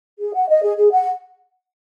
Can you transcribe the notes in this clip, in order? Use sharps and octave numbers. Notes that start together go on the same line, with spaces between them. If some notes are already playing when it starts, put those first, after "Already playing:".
G#4
F#5
D#5
G#4
G#4
F#5